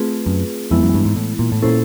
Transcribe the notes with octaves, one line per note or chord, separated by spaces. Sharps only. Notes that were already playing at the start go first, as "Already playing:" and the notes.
Already playing: A3 C4 F4 G#4 B4
F#2
F2 E3 G#3 B3 E4
F#2
G2
G#2
A2
A#2
A2
A#2 C#4 E4 A4 C5